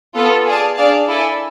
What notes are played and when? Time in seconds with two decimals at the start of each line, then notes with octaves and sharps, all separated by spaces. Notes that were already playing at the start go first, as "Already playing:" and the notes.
0.15 B3 F4 A4
0.46 G#4 D5 F5 A5
0.77 D4 G#4 D5 F5 A5
1.08 E4 A4 D5 G#5